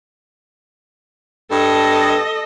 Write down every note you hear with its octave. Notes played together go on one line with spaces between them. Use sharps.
G2 A4 D#5